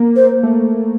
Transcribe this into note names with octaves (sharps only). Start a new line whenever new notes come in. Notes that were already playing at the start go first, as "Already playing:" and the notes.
Already playing: A#3
C5
A3